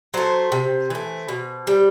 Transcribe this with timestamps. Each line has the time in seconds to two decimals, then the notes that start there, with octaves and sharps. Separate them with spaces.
0.14 F#3 A3 C5
0.52 C3
0.90 E3 A3
1.28 B2
1.67 G3